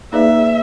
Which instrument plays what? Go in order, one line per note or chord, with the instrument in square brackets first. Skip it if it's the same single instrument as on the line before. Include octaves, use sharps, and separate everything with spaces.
[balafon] A#3 D#4 G#4 B4 D5 [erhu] E5